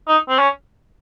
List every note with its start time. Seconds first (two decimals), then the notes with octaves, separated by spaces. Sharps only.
0.08 D#4
0.29 C4
0.39 C#4